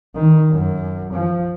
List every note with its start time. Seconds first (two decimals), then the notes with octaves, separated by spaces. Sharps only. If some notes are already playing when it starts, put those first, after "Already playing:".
0.15 D#3
0.51 F#2
1.13 F3